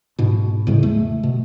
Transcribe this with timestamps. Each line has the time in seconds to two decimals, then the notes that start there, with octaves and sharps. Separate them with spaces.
0.19 G#2 B2
0.67 E2 A2 C#3 G#3
0.83 A3
1.23 B2